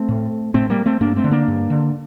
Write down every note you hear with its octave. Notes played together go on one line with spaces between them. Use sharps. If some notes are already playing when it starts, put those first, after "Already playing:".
Already playing: A3 C4
A2
A2 A3 C4
G3 A#3
A3 C4
G2 A#3 D4
A3 C4
D3
A#3 D4
G2
D3